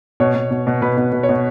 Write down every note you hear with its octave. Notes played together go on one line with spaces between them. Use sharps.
B2 C#5
B2
B2
B2
B2 B4
B2
B2
C#5
B2